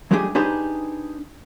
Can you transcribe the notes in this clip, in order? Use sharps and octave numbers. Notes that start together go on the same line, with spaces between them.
F#3 G#3 A3 D4 G4 G#4
D4 D#4 G4 G#4 B4 C5